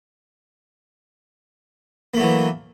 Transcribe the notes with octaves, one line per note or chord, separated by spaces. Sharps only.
E3 F#3 A3 A#3